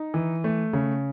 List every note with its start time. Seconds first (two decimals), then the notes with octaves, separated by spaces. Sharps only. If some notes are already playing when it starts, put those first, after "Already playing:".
Already playing: D#4
0.14 E3
0.44 A3
0.73 C#3